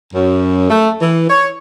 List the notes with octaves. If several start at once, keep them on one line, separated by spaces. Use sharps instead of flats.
F#2
A3
E3
C#5